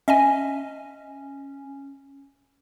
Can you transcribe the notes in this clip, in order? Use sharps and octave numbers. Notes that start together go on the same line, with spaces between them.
C#4 D#5 E5 G#5